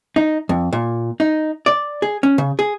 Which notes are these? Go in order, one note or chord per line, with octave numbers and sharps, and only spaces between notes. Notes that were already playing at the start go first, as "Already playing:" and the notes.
D#4
F2
A#2
D#4
D5
G#4
C#4
C#3
G#4